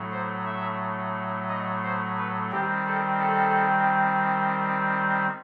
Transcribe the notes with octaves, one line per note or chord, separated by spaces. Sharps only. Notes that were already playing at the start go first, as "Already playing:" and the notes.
Already playing: A2 F#3 A3
C5
E5
D#5
C5
B4
D#3 G3 C4 G4
A4
A4